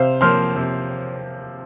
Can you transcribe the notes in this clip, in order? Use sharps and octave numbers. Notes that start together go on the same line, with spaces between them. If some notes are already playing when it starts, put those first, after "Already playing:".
Already playing: C3 C5 F5
F3 A#3 C6 F6
C3